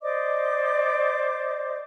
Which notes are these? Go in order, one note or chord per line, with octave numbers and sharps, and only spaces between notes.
C5 D5 D#5 D6